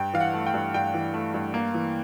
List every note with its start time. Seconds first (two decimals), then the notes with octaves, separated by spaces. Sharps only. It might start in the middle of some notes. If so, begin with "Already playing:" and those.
Already playing: G2 G5
0.14 E3 F5
0.20 F#5
0.34 A3
0.46 G5
0.54 G2
0.74 G2 G5
0.94 E3
1.14 A3
1.34 G2
1.54 A#3
1.74 E3